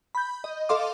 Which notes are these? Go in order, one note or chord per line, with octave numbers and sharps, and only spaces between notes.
B5 G6
D#5
A4 D#5 F5 C6 D6